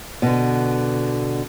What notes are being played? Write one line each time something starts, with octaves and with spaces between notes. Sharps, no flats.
B2 D3